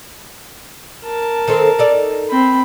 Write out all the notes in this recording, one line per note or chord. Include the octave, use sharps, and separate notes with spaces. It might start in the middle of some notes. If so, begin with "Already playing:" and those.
A#4 A5
D#3 C4 A4
D#4 A4 D5
C4 B5